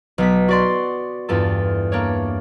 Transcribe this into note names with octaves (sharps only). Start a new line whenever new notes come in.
B1 B3 B6
F#4 D5 C6
E2 G2 F4 A4
A#3 D4 C#5